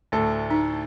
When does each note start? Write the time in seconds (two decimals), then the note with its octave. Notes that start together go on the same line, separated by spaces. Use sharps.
0.12 D2 A2 A4
0.50 D#4